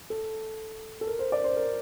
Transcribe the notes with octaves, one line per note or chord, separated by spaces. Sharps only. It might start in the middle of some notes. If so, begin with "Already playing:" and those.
A4
A4
A#4
C5
D5
C5
A#4